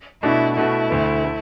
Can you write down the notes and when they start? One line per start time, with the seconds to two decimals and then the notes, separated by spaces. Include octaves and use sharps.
0.23 B2 A3 D4 E4 F#4
0.56 B2 A3 E4 F#4
0.90 D2 D3 A3
1.24 A3